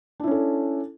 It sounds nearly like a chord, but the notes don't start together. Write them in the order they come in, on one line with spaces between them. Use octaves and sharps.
D4 E4 C#4 A4